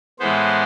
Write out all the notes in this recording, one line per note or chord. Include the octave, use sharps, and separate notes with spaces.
A2 E3 G#3 B3 C5